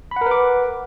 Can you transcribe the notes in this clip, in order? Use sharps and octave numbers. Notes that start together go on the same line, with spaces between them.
A#4 B4 F#5 B5 D6